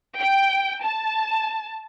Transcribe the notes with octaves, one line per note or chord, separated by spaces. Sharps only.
G5
A5